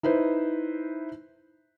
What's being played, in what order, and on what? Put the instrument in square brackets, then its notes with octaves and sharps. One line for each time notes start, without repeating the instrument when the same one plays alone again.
[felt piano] D#4 E4 B4 C5